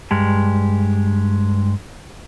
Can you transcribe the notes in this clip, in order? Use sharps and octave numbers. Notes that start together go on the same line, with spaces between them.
G2 G#3 G4